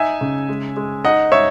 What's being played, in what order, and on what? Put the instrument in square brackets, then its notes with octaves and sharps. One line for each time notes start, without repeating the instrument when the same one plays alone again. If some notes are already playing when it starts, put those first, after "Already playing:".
Already playing: [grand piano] D#4 E5 G#5
C#3
G#3
G#3
D#4 D#5 F#5
D#4 C#5 E5